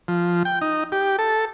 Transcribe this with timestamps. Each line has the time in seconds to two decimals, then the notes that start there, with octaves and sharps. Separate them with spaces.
0.08 F3
0.45 G5
0.61 D#4
0.92 G4
1.19 A4